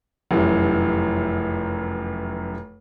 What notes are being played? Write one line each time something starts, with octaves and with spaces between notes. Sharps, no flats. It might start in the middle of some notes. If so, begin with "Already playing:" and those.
F1 F#2 E3